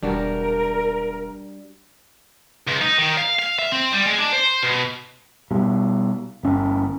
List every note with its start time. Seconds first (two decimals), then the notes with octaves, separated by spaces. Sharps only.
0.03 E1 G3 D4 F#4 A#4
2.68 C#2
2.81 D#4
2.99 D#3
3.18 F5
3.39 F5
3.59 E5
3.72 C4
3.93 G3
4.06 G#3
4.19 D4
4.33 C5
4.63 B2
5.51 B2 G3
6.43 G1 C#4